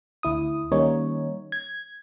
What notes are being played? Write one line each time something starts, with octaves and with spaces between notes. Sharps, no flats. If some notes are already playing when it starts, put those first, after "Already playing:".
D2 E4 D#6
D#3 G3 A#3 C#4 D#4 C#5
G#6